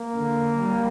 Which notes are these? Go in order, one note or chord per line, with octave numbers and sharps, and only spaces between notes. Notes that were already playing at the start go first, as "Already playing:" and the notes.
Already playing: A#3
D3
G3